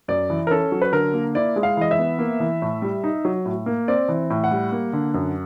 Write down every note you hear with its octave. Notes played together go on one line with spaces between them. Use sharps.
F#2 D5
E3
A#4
C#4 A4
F#3
B4
D3 A#4
A#3
E4 D5
G#3
F5
E3 D#5
E5
B3
A#3
E3
A2
G3
D#4
F#3
A2
A#3
C4 D5
E3
A2
F#5
G3
A#3
D3
F#2